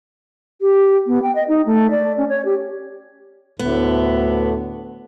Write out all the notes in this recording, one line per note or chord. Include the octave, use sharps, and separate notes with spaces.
G4
B3
G5
D#5
D#4
A3
D5
C#4
C#5
G4
D2 A2 D3 B3